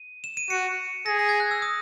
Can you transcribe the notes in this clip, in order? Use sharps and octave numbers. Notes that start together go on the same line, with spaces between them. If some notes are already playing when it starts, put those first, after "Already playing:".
Already playing: D#7
E7
D#7
F#4 C#7
G#4 A#6
A#6
G#6
F#6
E6
D#6